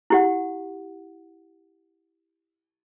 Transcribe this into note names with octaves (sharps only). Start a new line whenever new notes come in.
E4 G4 F#5